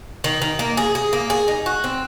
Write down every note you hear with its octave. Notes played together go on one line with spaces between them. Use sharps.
D#3
D#3
A#3
G#4
G#4
A#3
G#4
D#4
F#4
C4